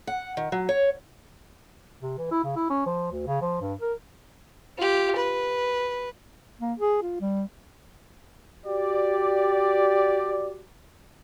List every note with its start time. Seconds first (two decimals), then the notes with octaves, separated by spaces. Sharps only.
0.07 F#5
0.37 D#3
0.52 F#3
0.69 C#5
2.02 C3
2.18 E3
2.31 E4
2.44 C#3
2.56 E4
2.70 C#4
2.86 F3
3.11 D2
3.27 C#3
3.42 F3
3.61 G2
3.81 A#4
4.77 F4 G4
5.16 B4
6.60 A#3
6.79 G#4
7.02 F4
7.21 G3
8.66 F#4 G4 D5